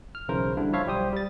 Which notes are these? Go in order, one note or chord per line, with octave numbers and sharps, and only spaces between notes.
F6
B1 C#3 E3 E4 A#4 C5
D3 G3 D4 E4
F3 E4 F4 C#5 E5 F5
B1 G3 G4 C5 D#6
G3 A6